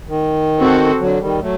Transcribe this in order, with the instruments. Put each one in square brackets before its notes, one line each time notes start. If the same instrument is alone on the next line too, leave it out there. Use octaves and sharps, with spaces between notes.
[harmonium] D#3
[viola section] C4 F#4 A4
[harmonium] D3 F#3
D#3 G3
F#3 A3